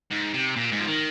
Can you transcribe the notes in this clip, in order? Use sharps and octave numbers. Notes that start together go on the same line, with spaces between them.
G#2
C3
A#2
G#2
F3
D#3